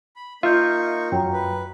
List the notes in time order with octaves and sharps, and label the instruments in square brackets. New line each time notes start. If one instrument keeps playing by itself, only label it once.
[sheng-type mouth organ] B5
[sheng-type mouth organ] A#3 D#4 C#6 [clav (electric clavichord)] F4 [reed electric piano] E5 [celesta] F6 G6
[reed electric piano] F#2 F#3 [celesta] G5 A#5
[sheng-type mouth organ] B4